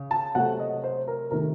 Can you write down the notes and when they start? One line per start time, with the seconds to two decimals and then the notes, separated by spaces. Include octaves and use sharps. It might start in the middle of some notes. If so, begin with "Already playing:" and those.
Already playing: C#3
0.11 A5
0.35 C3 F#3 A3 F#5
0.60 D#5
0.84 C5
1.08 A#4
1.31 C3 D#3 A3 C4 A#4